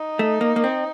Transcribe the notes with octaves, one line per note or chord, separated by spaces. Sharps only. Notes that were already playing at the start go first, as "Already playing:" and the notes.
Already playing: D#4
A3
A#3
A#3
C4